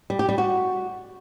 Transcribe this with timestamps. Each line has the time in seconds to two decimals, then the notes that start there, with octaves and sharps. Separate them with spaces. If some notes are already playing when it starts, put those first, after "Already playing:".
0.10 G3
0.19 G4
0.29 G3
0.38 F#4